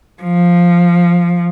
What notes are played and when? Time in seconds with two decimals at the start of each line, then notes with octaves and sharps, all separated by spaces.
0.23 F3